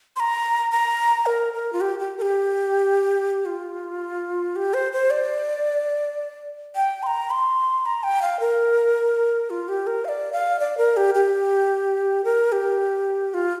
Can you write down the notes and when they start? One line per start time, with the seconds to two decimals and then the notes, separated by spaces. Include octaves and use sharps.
0.16 C6
0.20 A#5
0.71 A#5
1.26 A#4
1.54 A#4
1.73 F4
1.81 G4
1.99 G4
2.18 A#4
2.22 G4
3.45 F4
4.56 G4
4.74 C5
4.92 C5
5.10 D5
6.75 G5
7.03 C6
7.06 A#5
7.30 C6
7.86 A#5
8.03 G5
8.22 F5
8.40 A#4
9.50 F4
9.68 G4
9.87 A#4
10.05 F5
10.08 D5
10.32 F5
10.59 D5
10.77 A#4
10.97 G4
11.15 G4
12.24 A#4
12.52 G4
13.34 F4